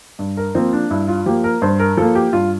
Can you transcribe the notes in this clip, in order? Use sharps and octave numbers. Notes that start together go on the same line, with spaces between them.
G2
A#4
F3 A#3 C4
D4
G2 E4
F4
F3 A#3 G4
A#4
G2 C5
A#4
F3 A#3 A4
G4
G2 F4